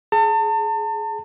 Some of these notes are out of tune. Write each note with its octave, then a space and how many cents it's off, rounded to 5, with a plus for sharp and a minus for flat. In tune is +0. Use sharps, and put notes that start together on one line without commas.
G#4 +20 A5 +40